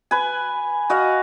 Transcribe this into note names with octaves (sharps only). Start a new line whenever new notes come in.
B4 G#5
F#4 D#5 F5